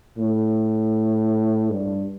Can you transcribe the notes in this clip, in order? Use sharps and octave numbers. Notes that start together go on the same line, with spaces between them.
A2
G2